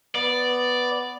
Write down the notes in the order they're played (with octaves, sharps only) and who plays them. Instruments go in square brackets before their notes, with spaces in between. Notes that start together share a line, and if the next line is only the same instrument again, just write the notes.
[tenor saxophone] B3 [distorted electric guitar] D5